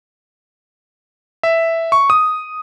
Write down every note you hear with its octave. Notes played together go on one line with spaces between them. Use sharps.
E5
C#6
D#6